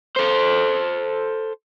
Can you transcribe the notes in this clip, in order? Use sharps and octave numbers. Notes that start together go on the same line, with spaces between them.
A4 C5